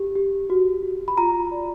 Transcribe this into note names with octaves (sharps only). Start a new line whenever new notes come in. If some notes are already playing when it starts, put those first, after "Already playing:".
Already playing: G4
G4
F#4
F#4
B5
F4 A#5
D5